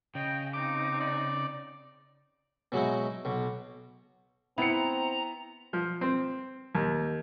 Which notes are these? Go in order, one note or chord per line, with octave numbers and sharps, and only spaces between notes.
C#3 D#5 G5
C4 D#4 D6
D5
B2 F#3 G#3 D#4 E4
B1 B2
B3 C4 E4 A#5 C#7
F3
C4
D#2